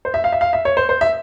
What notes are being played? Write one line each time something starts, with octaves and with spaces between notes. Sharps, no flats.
C5
E5
F5
E5
F5
E5
C#5
C5
C5
E5